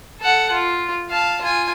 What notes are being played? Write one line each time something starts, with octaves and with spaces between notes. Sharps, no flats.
A4 F#5
F4
F5 A5
F4 G#5